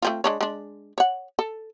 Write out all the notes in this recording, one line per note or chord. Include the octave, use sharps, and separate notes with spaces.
A3 C4 F4
G#3 D4 C#5
G#3 D4
C#5 F#5
A4